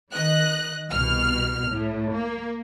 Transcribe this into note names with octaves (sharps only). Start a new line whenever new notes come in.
D#3 D#5 F#6
C2 B2 F6
A2
A#3